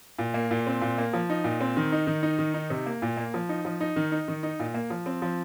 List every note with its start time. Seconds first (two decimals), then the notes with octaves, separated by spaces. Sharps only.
0.18 A#2
0.34 A#3
0.51 A#2
0.66 C4
0.82 A#2
0.98 A#3
1.13 F3
1.30 D#4
1.44 A#2
1.60 C4
1.77 D#3
1.92 D#4
2.07 D#3
2.23 D#4
2.39 D#3
2.54 D#4
2.70 C3
2.86 A#3
3.02 A#2
3.17 A#3
3.34 F3
3.49 D#4
3.65 F3
3.80 D#4
3.96 D#3
4.12 D#4
4.28 D#3
4.43 D#4
4.60 A#2
4.74 A#3
4.90 F3
5.06 C4
5.22 F3